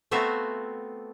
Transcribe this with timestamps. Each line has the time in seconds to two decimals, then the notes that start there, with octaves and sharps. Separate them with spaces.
0.11 A3 B3 C4 F#4 E5 F5